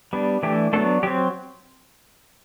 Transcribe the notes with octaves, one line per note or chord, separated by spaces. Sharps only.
G3 B3 D4
E3 A3 D4 G4
F#3 A3 B3 D4 A4
F#3 C4 G4